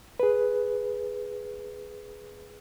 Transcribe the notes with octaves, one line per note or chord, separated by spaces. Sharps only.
G#4 B4